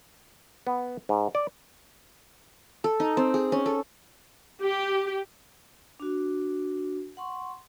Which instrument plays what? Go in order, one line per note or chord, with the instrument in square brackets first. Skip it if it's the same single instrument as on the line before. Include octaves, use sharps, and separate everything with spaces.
[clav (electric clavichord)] B3
G#2
D5
[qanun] A4
D#4
C4
G#4
C#4
A4
[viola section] G4
[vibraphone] D4 F#4
F#5 C6 C#6